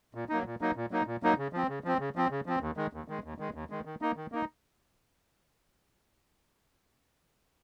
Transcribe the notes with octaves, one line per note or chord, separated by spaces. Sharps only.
A#2
F#3 A#3 D#4
A#2
F#3 A#3 D#4
A#2
F#3 A#3 D#4
A#2
F#3 A#3 D#4
C#3
F3 C4
C#3
F3 C4
C#3
F3 C4
C#3
F3 C4
D#2
D#3 G#3
D#2
D#3 G#3
D#2
D#3 G#3
D#2
D#3 G#3
D#3
A#3 D#4
D#3
A#3 D#4